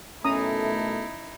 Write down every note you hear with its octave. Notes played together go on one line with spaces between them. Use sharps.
B2 D#3 A3 C#4 D#4 E4 A#5 D#6